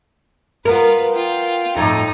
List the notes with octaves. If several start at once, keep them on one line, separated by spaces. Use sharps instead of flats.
B3 F4 A#4 B4
F4 G5
F2 A2 D#4